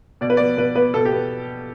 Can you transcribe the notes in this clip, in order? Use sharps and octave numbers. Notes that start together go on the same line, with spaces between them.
B2 D5
B4
B3 D5
B2 B4
B3 B4
B2 A4
G4
B3